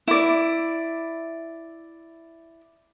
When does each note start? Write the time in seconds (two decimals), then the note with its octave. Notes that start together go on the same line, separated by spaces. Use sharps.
0.08 E4 D5